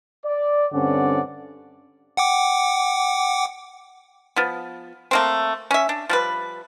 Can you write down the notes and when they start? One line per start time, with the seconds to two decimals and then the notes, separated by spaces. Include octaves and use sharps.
0.24 D5
0.73 G2 D3 C4 C#4 D5 F#5
2.17 F#5 G5 D6
4.36 F3 B3
5.11 A3 A#3 C4
5.71 C#4 E5
5.89 D4
6.09 F3 G3 B4